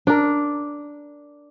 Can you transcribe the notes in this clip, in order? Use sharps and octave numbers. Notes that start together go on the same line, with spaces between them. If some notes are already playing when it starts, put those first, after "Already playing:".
D4 A#4